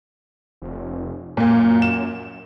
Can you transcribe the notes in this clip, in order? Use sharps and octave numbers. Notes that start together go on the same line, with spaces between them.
F1
F#2 A#2 A#3
E7